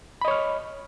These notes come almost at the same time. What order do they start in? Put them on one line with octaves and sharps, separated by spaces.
B5 D#5 C#5 F6